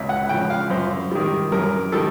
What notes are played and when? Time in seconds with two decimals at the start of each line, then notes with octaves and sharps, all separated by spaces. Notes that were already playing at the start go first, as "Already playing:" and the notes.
Already playing: C#2 E5
0.09 F#5
0.29 C#3 F3 G5
0.50 F5
0.70 F#2 C5
1.11 D#3 G3
1.52 F#2 A#4
1.92 D#3 G3 A4